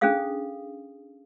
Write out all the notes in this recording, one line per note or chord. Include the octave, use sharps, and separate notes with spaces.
C#4 D4 G#4 A4 F5 D#6